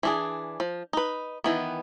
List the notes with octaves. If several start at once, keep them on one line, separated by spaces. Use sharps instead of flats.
E3 D4 G#4
F3
D#4 B4
D#3 E3 B3